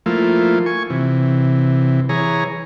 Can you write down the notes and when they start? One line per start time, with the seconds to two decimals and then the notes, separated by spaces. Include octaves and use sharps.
0.06 F3 A3 A#3 E4 F4
0.66 G#5 C#6
0.90 C3 E3
2.09 E3 G#4 C#5 A#5